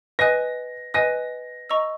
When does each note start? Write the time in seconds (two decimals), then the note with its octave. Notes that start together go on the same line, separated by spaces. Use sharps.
0.19 B4 D#5 G#5 D#6 F#6 A#6
0.94 B4 D#5 G#5 D#6 F#6 A#6
1.70 D#5 A#5 C#6 E6